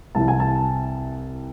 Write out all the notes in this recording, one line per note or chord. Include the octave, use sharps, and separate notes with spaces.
C2 C3 E3 A5
G#5
A5